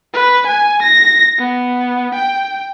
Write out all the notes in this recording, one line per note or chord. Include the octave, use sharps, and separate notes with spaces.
B4
G#5
A#6
B3
G5